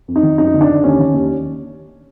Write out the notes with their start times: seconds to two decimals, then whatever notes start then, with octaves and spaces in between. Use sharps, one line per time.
0.08 F2
0.16 D#4
0.23 D#3
0.38 F#2 D#4
0.54 D3
0.61 D4
0.69 D3
0.84 D#2 C#4
0.99 D#3
1.14 D#2